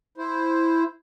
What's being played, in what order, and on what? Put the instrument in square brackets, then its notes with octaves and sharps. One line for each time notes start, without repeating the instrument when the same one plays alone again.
[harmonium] E4 C5